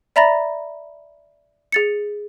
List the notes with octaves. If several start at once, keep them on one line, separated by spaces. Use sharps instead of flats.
D5 E5 A#5 B5 A6 A#6
G#4 A6 C#7